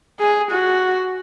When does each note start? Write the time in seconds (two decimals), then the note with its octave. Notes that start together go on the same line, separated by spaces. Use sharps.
0.20 G#4
0.51 F#4